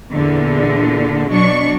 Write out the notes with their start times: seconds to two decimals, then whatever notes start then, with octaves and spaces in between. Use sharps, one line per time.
0.12 E2 A#2 D3
1.31 B2 F#3 D4 C#6